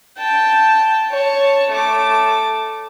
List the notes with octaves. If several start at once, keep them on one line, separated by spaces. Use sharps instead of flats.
G5 A5
C#5 A5
A3 D6